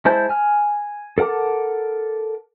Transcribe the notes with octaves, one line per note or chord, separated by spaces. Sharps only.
G#3 E4 C5 A5 G6
G#5 F6
A4 A#4 F#5 A5 D6